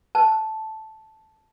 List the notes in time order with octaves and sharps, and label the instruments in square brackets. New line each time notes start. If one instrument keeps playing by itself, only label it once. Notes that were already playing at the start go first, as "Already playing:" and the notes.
[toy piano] A5